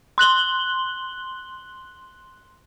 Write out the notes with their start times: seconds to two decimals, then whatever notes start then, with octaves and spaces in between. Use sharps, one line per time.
0.18 C6 F#6 F#7 G7